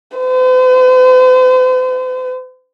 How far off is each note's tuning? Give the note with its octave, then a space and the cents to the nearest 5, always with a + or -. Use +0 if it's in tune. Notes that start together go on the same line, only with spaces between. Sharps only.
C5 -45